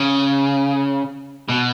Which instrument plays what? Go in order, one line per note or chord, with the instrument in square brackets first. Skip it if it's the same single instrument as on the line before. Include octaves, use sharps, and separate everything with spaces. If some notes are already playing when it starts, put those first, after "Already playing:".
Already playing: [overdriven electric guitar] C#3
B2